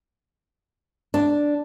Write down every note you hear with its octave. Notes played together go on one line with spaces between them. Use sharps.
D4